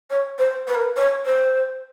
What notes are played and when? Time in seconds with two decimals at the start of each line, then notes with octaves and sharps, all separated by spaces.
0.10 C#5
0.38 C5
0.67 B4
0.75 A#4
0.81 B4
0.96 C#5
1.25 C5